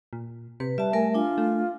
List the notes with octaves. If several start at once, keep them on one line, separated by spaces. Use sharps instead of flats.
A#2
C3 B4
G3 B4 E5 A5
A3 A#4 E5 G#5
D4 F4 G#5
A3